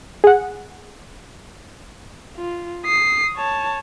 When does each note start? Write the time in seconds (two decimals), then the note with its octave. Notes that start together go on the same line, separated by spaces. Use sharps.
0.24 G#4 F#5
2.37 F4
2.85 D#6 C7
3.37 C#5 A5